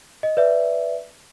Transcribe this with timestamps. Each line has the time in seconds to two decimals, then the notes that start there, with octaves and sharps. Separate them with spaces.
0.23 D#5
0.37 B4 D5 E5